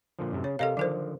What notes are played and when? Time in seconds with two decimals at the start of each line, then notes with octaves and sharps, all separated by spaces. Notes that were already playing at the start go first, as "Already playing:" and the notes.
0.19 A#2 D3 F3
0.32 F#2 A2 C3
0.44 C#3 C#5
0.59 C3 A4 A#4 D#5 F5
0.77 D3 D#3 F3 F#3 A#4 C5